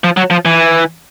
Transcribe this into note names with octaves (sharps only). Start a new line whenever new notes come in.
F3
F#3
F3
E3